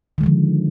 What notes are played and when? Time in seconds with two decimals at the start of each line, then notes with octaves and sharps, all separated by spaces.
0.18 D#3
0.21 G#3
0.23 D3
0.26 F3